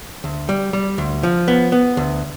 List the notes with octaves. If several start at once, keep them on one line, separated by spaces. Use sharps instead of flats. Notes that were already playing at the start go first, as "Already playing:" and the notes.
D2
G3
G3
D2
F3
B3
B3
D2